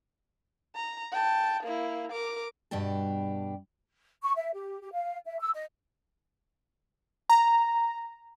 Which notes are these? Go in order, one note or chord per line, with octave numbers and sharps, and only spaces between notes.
A#5
G5 A5
A#3 E4
A#4 D6
G2 B2 D4 G4 A5
C#6
E5
G4
G4
F5
E5
E6
D#5
A#5